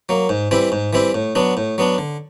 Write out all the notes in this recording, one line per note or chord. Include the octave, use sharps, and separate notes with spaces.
F#3 A#3
G#2
E3 G3 C4 E4
G#2
E3 G3 C4 E4
A2
F#3 B3 D4
A2
F#3 B3 D4
D3